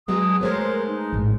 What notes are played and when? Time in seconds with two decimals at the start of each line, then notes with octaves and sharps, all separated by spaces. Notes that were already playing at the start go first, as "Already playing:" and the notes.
0.08 F#3 G#3 B3 G#4 D#6
0.41 G#3 A3 B3 A#4 C5 C#5
0.88 D#4
1.13 A1 G#2